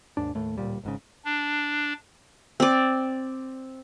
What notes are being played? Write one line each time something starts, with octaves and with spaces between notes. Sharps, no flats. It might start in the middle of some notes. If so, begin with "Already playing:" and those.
D#2 G#2 D4
D#2 A2 A3
D1 A#2 G3
G#1 G#2 C#3
D4
C4 D5